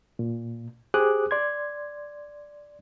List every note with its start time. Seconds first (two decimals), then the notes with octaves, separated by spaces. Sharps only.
0.19 A#2
0.94 G4 G#4 C5 D6 D#6 F#6
1.31 D5 C6 G#6